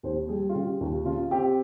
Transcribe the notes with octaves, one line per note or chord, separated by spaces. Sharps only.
D#2 C5
G3 G#4
F4
C#3 G4
D#2 F4
C#3 F4
C4 G4